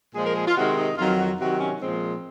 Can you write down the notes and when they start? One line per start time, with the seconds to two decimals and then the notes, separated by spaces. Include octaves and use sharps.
0.15 A#2 F3 G#3 G#4
0.26 A#4
0.36 G#4
0.46 F4
0.57 C3 D#3 G#3 F#4
0.78 D#4
0.98 F2 D#3 F#3 F4
1.19 F#4
1.40 C3 D#3 F#3 F#4
1.60 C#4
1.81 A#2 F3 G#3 C4